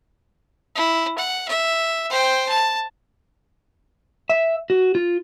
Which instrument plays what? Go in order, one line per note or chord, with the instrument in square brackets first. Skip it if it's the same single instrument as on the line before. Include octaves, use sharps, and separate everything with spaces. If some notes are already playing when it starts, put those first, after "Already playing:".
[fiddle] E4
F#5
E5
C5 G5
A5
[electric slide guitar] E5
F#4
F4